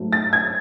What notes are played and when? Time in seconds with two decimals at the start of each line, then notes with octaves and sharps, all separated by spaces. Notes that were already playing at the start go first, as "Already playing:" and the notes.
Already playing: G#2 F#3 A3
0.13 A6
0.33 G#6